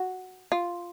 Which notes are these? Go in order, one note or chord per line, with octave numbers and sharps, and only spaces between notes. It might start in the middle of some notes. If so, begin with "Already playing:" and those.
Already playing: F#4
F4